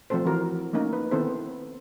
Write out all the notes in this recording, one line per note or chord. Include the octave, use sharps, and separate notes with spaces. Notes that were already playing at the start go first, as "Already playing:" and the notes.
F3 A3 C4 A4 C5
E3 C4 F#4 A#4
A3 A#3 C#4 D#4 A#4
B4
D#3 B3 C4 E4 A4 C5